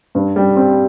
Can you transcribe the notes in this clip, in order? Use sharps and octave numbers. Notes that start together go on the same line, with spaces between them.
G2
G3
C4